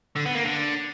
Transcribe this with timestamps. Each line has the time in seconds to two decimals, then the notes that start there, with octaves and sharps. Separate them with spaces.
0.16 D3
0.25 B3
0.35 A#3
0.44 D3